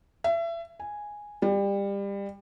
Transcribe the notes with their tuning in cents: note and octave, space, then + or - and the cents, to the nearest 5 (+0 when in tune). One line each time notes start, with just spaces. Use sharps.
E5 +30
G#5 -5
G3 +25